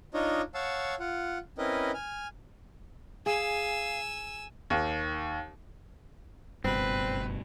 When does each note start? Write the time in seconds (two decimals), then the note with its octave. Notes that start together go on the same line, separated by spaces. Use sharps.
0.14 D4 D#4 F4 C#5 D#5
0.54 C#5 F5 F#5 A5 E6
1.00 F4 F#5
1.58 C4 C#4 E4 A#4 B4 D#5
1.94 G#5 F6
3.26 G#4 F5 G#5 E6
4.70 D#2
6.64 F#1 G2 B2 C4 B4